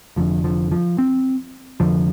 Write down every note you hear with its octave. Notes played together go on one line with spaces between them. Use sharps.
F1 F2 D3 F3
F3
F3
C4
F1 F2 D3 F3